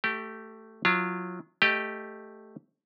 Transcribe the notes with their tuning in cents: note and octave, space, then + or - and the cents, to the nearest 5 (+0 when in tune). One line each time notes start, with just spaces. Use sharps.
A3 +10 G4 -15
F#3 -25 F4 -35
A3 +0 G4 +0 D#5 -15